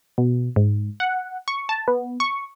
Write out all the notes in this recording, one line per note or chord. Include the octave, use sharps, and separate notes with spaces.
B2
G#2
F#5
C#6
A5
B3
C#6